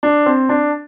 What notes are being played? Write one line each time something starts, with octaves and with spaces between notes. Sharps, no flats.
D4
C4
D4